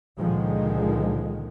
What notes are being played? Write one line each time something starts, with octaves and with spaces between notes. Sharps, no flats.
C#2 A#2 D3 D#3 F3 G#3